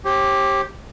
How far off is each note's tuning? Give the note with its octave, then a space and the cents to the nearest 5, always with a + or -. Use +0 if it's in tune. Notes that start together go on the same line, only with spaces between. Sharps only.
G4 +0 C#5 -45